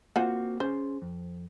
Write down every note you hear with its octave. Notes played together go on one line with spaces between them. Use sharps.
A#3 C4 F4 F#4 C5 F#5
C#4 G#4 C5 C6
F2